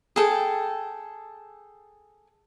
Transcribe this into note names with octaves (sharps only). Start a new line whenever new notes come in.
G#4 A4 G5